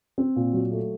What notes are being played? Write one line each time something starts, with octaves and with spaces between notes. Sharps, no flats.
C4
A#2
F#3
A3